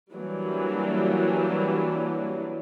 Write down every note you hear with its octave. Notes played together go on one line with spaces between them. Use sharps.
E3 F#3 G3 A#3 D4